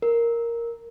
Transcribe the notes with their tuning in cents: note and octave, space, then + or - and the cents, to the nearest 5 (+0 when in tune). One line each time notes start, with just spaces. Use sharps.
A#4 +0